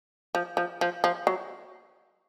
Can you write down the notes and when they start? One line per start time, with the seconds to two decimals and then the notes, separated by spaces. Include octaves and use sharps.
0.35 F3
0.57 F3
0.81 F3
1.04 F3
1.27 F#3